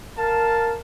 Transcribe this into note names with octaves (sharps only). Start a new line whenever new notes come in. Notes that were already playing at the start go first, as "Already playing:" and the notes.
A#4 F5 A5